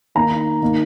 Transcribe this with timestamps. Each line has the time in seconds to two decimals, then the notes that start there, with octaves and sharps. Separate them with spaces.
0.15 D#3 A#3 D#4 A#5
0.61 D#3 A#3 D#4